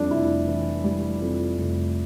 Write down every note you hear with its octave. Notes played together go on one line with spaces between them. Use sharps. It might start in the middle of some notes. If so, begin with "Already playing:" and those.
Already playing: F2 G3 D4
F1 E4
E3
G3
F2
F1